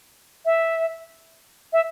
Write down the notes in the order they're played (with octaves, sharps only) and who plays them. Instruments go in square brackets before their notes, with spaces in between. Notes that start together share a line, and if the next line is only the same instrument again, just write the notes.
[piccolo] E5
E5